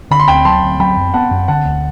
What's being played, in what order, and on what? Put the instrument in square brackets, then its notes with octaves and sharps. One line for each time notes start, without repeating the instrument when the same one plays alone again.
[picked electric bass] D3 [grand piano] B5
[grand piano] C6
[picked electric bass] D2 [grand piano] G5 B5
[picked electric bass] F#3 [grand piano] A5 C6
[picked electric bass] D2
[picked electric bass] F#3 [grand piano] G5 B5
[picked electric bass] F#2
[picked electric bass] B3 [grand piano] F#5 A5
[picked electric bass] F#2
[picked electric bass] D3 [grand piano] F#5 A5
[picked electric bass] D2